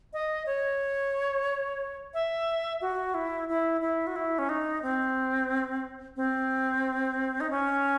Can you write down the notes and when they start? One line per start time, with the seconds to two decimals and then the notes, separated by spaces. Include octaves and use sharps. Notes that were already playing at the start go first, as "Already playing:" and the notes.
0.13 D#5
0.46 C#5
2.14 E5
2.81 F#4
3.14 E4
3.49 E4
3.81 E4
4.07 F#4
4.16 E4
4.38 C#4
4.49 D#4
4.82 C4
6.16 C4
7.40 D#4
7.50 C#4